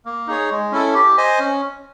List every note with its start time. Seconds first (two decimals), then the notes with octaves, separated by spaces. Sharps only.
0.06 A#3
0.27 D#4 G#4 C#5
0.51 G#3
0.72 C#4 E4 A4
0.94 G4
1.17 C5 D#5 G#5
1.39 C#4